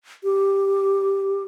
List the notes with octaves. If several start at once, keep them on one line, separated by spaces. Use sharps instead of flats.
G4